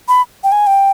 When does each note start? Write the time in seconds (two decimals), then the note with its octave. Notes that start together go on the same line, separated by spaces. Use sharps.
0.08 B5
0.44 G5
0.52 G#5
0.67 G5